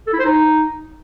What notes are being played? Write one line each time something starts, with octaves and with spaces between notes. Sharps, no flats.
A4
E4
C5
D#4